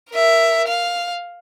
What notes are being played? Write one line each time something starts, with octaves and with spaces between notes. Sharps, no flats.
A#4 E5
F5